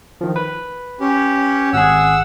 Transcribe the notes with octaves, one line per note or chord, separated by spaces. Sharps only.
D#3 F3
B4
C#4 G4
G#1 G#4 F#5 E6